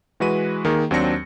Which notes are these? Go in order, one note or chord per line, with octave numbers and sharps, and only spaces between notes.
E3 G#3 F#4 B4 D#7
D#3 A#3 G#4
D#2 F#3 C4 D4 A#6 C#7